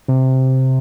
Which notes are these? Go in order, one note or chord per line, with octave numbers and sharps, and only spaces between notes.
C3